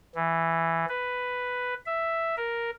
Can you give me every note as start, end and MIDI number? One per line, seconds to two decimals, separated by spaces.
0.15 0.85 52
0.89 1.74 71
1.86 2.35 76
2.37 2.70 70